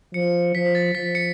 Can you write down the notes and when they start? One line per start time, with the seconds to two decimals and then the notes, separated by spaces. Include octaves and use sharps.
0.14 F3 C#7
0.55 F3 B6
0.75 A6
0.95 F3 B6
1.15 C#7